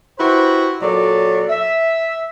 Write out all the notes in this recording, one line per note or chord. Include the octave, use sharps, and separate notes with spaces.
E4 F#4 G4 B4 C5
A#2 F#3 A4 D5
E5